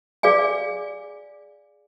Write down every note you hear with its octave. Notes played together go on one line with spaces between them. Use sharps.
G#4 D5 F5 G#5